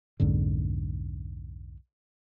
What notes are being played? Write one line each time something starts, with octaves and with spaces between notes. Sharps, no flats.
B1 F2 G#2 D3